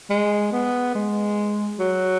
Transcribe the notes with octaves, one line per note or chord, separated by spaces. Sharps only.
G#3
B3
G#3
F#3